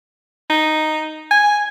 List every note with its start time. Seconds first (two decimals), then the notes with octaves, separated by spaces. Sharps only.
0.50 D#4
1.31 G#5